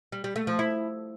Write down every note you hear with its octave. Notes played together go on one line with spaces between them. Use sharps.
G3
G3
A3
F3
E4